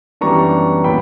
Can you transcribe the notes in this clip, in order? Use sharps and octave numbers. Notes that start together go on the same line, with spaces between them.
F#2 E3 G3 B3 D4 A#5 C#6
A#2 F#3 B3 D4 G5 B5